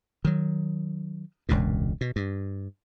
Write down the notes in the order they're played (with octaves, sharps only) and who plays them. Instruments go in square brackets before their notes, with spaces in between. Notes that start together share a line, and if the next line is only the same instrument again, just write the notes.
[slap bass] D#3 F#3
E1 C#2 G2 A#2
B2
G2